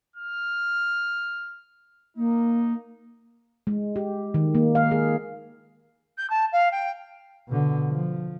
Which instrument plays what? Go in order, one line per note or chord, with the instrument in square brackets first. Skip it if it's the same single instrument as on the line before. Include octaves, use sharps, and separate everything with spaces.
[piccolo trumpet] F6
[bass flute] A#3 [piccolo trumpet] D#4
[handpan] G#3
G4
D#3
A#3
F5
G#4
[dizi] G6
A5
F5
G5
[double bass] B2 D3
F3